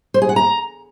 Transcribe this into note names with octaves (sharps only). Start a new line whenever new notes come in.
C5
G#4
F#5
A#5